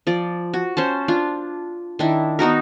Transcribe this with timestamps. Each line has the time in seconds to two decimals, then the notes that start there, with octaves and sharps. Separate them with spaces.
0.07 F3 D5
0.54 F#4
0.77 C#4 C5 A5
1.08 D4 F4
1.99 D#3 D4 E4
2.39 B3 D#4 F#4 A#4